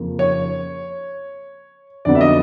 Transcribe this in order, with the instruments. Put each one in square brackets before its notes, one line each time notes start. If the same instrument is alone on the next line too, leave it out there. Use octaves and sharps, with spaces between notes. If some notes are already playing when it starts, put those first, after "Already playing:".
Already playing: [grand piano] F2 C#3 F3 A#3
[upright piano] C#5
[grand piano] F2 D3 F#3 B3 [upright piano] D5
[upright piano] E5
D#5